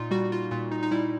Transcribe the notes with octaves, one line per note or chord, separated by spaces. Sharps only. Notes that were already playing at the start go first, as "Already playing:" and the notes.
Already playing: A#2 D#4 F4
G3 F#4
F4
A#2 F4
D#4
D#4
G3 E4